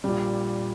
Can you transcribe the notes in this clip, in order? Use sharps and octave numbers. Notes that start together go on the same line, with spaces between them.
A#1 A#2 G3